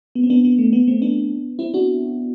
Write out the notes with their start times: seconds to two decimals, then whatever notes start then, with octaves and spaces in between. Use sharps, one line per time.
0.15 B3
0.23 C4
0.30 B3 D4
0.45 B3
0.59 A3
0.73 B3
0.87 A3 C4
1.02 B3 D4
1.59 C4 E4
1.74 D4 F#4